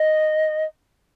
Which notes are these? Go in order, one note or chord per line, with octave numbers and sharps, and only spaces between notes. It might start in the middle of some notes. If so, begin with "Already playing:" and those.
Already playing: D#5